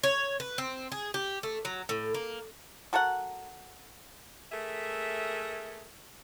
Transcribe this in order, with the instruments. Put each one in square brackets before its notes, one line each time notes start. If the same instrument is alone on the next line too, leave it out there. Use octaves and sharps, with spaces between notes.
[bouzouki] C#5
B4
C4
G#4
G4
A3
F#3
A2
A#3
[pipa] F#4 A4 A#4 F#5
[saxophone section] A3 G#4 A#4 E5